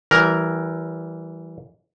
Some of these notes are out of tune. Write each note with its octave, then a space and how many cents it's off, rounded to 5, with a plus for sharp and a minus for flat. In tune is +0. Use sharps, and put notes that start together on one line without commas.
E3 +0 G3 -30 A#4 +0